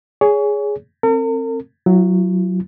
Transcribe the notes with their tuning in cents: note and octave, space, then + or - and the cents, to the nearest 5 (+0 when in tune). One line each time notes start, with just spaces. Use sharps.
G#4 +0 C#5 +30
C4 +20 A#4 -45
F#3 +0 E4 +45